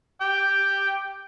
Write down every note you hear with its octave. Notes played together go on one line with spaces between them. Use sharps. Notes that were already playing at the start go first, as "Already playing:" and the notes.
G5 D6